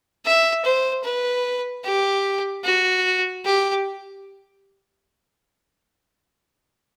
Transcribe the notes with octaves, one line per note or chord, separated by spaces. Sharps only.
E5
C5
B4
G4
F#4
G4